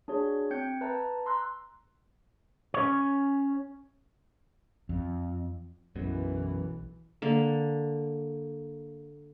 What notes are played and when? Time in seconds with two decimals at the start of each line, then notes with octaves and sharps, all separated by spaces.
0.08 D4 F#4 G#4 C#5
0.51 C4 G5 G6 G#6 C#7
0.81 B4 E5 A5 A#5
1.26 A#5 C6 E6 F#6
2.74 C#4 C#5
4.89 F2
5.96 B1 F#2 B2 E3
7.22 D3 A#3